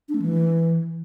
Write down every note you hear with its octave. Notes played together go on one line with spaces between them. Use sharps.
D4
A3
E3